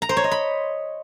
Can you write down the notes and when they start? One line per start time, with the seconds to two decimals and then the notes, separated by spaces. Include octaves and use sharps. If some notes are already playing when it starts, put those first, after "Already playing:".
0.02 A#5
0.09 C5
0.17 C#5
0.24 D#5
0.31 B5